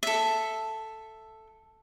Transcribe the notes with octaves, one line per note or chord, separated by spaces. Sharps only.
A4 E5